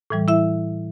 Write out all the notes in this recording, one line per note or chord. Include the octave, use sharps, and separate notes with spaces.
A2 E3 G3
E4 E5